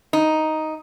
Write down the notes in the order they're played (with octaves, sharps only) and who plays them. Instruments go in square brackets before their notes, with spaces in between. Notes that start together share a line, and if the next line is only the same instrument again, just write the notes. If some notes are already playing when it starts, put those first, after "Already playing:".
[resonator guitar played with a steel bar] D#4